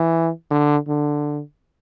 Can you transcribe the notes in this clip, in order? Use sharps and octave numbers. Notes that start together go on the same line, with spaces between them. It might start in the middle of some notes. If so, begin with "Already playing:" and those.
Already playing: E3
D3
D3